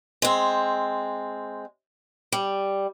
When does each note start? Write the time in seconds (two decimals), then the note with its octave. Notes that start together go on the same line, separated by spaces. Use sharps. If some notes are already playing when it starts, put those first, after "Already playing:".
0.22 G#3 C4
2.32 G3